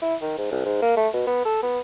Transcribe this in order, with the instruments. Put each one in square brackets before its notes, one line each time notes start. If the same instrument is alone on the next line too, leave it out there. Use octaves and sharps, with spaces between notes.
[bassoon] E4
D#3
G#2
C2
G#2
A#3
A3
B2
B3
A4
B3